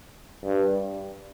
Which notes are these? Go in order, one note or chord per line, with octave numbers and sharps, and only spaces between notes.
G2